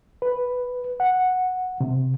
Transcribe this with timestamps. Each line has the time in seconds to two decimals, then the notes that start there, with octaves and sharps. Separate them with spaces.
0.22 B4
1.00 F#5
1.81 C3